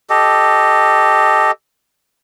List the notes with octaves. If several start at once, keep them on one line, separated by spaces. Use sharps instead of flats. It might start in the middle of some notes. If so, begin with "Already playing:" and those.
G4 A4 D#5